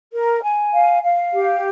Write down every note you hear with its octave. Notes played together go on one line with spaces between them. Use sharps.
A#4
G#5
F5
F5
G4